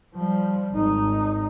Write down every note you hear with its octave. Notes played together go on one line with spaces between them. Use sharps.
F3 G3
G#1 D#4